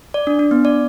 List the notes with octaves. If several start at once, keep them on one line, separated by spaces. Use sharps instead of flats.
D5
D4
D4
B3
D5